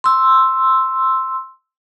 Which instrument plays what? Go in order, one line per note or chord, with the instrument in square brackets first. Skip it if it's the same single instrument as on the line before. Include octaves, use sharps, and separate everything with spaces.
[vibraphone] C6 E6